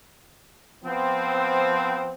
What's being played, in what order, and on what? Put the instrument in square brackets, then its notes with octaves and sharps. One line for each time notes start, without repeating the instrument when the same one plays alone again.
[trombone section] F3 B3 C4